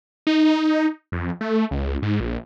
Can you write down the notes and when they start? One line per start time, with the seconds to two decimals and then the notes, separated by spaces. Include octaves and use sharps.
0.27 D#4
1.12 F2
1.41 A3
1.71 C#2
2.02 G#2
2.20 A#1